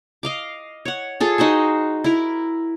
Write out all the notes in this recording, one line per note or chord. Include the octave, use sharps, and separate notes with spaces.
D#5 F5 D6
C#5 F#5
F4 G#4 A4
D#4 F#4 C5 G#5
E4 A#4